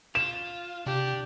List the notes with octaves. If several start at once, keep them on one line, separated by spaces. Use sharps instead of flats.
F4 E7
C3 D4 G4